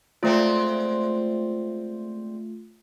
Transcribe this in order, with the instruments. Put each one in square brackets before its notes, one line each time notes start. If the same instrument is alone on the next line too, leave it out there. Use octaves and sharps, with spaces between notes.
[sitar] G#3 C4 D5 [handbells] A3 F4